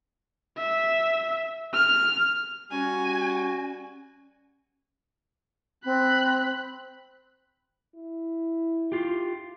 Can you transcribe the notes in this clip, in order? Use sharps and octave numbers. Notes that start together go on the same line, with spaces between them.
E5
F6
G3 C#4 F#4 G#5
C4 B5 F#6
E4
F4 G4